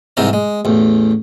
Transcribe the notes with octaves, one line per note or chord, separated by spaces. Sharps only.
C2 G#2 C3 E3 C4 A#4
G#3
A1 E2